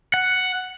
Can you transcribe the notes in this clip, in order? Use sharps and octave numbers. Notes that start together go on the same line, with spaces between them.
F#5